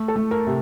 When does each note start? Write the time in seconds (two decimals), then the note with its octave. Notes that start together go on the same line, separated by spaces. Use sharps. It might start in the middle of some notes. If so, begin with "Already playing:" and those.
Already playing: A3
0.08 A4
0.16 A3
0.31 A#4
0.47 C3